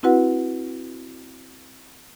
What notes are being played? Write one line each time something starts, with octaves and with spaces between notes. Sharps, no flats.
C4 E4 F#4 B4 F#5